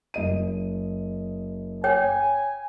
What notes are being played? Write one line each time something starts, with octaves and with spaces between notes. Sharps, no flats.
F#1 D#5 D#7
C#5 G5 G#5